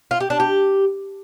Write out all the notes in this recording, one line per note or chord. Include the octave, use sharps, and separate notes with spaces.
F4
G4
D4
G4